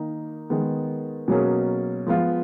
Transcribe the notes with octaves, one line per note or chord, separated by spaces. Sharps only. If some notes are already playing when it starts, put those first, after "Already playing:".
Already playing: D#3 A#3 D#4
D#3 G#3 B3
B2 F#3 A#3 C#4 G#4
F3 G#3 B3 F4